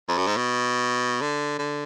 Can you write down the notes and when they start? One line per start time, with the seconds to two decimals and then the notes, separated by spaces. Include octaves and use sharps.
0.09 F2
0.18 F#2
0.27 G#2
0.37 B2
1.21 D3
1.59 D3